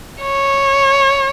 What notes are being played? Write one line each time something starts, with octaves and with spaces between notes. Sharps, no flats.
C#5